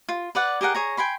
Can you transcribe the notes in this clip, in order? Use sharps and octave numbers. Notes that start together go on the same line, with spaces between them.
F4
B4 D5 F#5
G4 G#4 A#4 F#5
G#4 C#5 A#5
G5 G#5 B5 C6